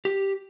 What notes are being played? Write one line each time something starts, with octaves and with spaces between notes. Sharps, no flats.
G4